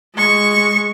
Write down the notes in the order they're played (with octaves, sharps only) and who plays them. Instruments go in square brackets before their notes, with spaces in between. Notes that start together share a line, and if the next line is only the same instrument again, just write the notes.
[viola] G#3 C#6